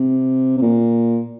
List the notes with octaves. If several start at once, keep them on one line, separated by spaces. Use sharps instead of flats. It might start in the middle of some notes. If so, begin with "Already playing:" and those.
Already playing: C3
C3
A#2